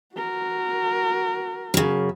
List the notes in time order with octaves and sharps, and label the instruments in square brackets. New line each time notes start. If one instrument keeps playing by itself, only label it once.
[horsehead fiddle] F#4 A#4
[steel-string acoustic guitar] F#2 C#3